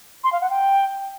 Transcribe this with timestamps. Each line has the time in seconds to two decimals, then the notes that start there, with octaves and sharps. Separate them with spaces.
0.24 C6
0.32 F5
0.41 F#5
0.50 G5